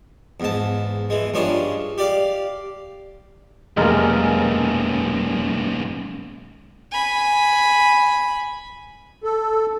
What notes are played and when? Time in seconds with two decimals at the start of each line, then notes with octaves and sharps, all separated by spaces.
0.40 E2 G#2 A5
1.10 E3 G#3
1.34 G2 G#3 C#4 D4 F4
1.98 G4 D5 F5
3.77 F1 B1 F#2 G#3 A#3 A#5 F6
6.91 G#5 B5
9.23 A4